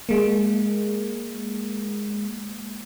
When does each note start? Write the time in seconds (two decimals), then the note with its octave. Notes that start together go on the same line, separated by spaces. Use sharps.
0.09 G#3 A#3